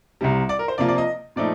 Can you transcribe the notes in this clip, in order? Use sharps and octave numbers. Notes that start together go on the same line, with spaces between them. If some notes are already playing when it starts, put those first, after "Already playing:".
C2 C3 G3
D5
A#4
C5
C3 F3 A#3 F4 D5
D5
D#5
A#2 F3 A3 D#4 D5